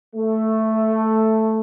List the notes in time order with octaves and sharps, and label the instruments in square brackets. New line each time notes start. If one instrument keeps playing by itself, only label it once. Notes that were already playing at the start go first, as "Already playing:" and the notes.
[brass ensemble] A3